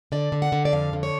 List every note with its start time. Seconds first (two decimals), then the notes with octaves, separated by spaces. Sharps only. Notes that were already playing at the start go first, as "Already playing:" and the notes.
0.12 D3 D5
0.32 D3
0.42 F#5
0.52 D3
0.65 D5
0.72 F2 F5
0.93 D3
1.03 C#5